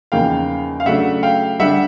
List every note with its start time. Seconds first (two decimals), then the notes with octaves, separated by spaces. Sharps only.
0.12 E2 C#3 F3 A#3 D#4 F5 G5
0.80 F5
0.86 C#3 F#3 A3 D4 E5 F#5
1.23 F5 G5
1.60 D3 G3 E5 F#5